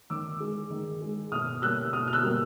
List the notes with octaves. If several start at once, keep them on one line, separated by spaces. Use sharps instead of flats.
D#3 D6 E6
G#3
D#3
G#3
B2 D#6 F6
G3 A#3 E6 F#6
B2 D#6 F6
F6
E6 F#6
G3 A#3